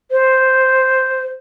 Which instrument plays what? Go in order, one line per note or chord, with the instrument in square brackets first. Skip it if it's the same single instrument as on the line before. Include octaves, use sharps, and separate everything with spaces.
[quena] C5